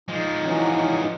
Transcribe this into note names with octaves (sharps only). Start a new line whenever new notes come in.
F3 G#3 D#4
E3 F#3 C#4